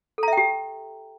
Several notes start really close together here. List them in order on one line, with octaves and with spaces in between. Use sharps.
A4 A#5 E5 G5 G4